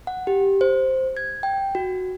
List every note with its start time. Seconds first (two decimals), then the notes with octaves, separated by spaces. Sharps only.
0.07 F#5
0.27 G4
0.61 C5
1.17 G#6
1.43 G5
1.75 F#4